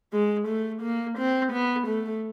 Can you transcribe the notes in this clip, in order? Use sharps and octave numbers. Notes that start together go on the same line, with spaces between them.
G#3
A3
A#3
C4
B3
A3